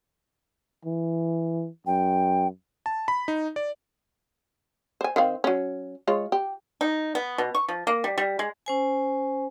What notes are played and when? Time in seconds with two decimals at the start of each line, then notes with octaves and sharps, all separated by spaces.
0.85 E3
1.87 F#2 G5
2.86 A5
3.08 B5
3.28 D#4
3.56 D5
5.01 C5 G#5
5.16 D#3 C4 F5
5.44 F#3 C#4
6.07 G#3 F4 C#5
6.32 G4
6.81 D#4
7.15 B3
7.38 B2
7.55 C#6
7.68 F3
7.87 A#3
8.04 G3
8.18 G3
8.39 G#3
8.66 C#4 C5 G#5